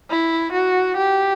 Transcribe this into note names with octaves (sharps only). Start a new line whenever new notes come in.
E4
F#4
G4